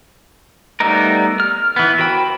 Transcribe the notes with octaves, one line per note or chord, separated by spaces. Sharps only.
G3 A3 B3 D#4 A#4
F6
E3 B3
F#4 A#4 C5 G5 B5